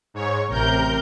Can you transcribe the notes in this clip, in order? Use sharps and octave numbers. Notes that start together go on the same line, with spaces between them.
G#2 C#5
A1 C3 A#4 G6